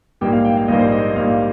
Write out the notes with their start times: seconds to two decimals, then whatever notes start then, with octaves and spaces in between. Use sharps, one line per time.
0.21 A#1 G#2 G3 A#3 G4
0.33 F5
0.45 G5
0.57 F5
0.68 A#1 G#2 G3 A#3 D#5
0.80 C5
0.92 D#5
1.15 A#1 G#2 G3 A#3 F5